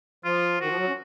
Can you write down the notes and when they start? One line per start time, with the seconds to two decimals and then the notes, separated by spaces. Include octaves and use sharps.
0.25 F3 F4
0.60 D#3 F#4
0.69 F3
0.78 F#3
0.87 C#4